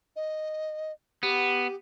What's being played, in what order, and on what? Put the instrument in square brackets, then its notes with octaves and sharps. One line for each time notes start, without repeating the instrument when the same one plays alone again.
[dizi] D#5
[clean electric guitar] B3 [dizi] G4